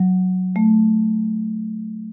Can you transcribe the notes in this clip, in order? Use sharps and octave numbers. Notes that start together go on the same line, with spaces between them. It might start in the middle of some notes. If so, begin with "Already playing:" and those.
Already playing: F#3
A3